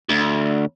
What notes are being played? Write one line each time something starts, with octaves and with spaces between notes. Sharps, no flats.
D2